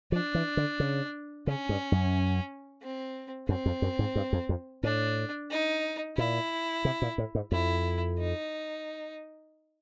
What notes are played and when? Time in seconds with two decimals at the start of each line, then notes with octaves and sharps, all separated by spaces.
0.12 F3 D4
0.35 E3
0.57 D3
0.80 C#3
1.47 C#3 C#4
1.69 G2
1.92 F#2
2.82 C4
3.49 F#2 C4
3.66 F2
3.82 F#2
3.99 G#2
4.16 G2
4.33 F2
4.49 F2
4.83 A2 D4
5.51 D#4
6.17 A#2 E4
6.85 C3
7.02 A#2
7.18 A2
7.35 G#2
7.52 F2 E4
8.19 D#4